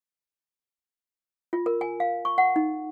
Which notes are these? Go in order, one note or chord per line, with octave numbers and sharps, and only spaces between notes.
F4
A#4
G#5
F5
C#6
F#5
D#4